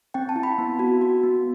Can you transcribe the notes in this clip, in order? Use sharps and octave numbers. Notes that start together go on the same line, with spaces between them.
C4 G5
A5
E4
B5
B3
F#4
F#4
B3